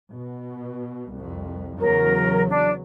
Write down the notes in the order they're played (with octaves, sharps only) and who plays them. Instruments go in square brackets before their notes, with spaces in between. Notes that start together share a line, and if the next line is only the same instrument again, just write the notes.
[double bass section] B2
C2 F2
[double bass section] E2 C#3 F#3 [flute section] A#4
[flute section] D4